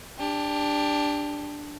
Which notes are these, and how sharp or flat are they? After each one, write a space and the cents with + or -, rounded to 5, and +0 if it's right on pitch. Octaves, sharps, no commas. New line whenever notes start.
D4 +0 G4 +25